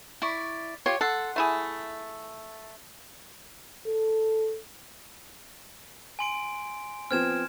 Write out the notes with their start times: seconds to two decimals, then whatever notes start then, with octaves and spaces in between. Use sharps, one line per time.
0.22 E4 D5 C#6
0.86 F4 G4 C#5
1.01 A4 F#5 C6
1.36 A3 E4 G#4
3.87 A4
6.19 G#5 C6 D7
7.11 F3 B3 C4 F6 G#6 E7